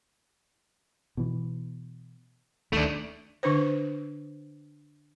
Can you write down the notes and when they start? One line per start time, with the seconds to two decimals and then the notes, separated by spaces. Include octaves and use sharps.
1.17 B2 E3
2.73 D2 D3 D#3 A3 D4
3.43 D3 D4 B4 C5